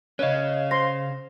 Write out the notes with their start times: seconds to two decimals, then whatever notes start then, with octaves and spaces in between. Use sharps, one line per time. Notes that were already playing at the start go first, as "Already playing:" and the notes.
0.19 C#3 C#4 B4 C#5 D#5 F5
0.71 C5 C6 A#6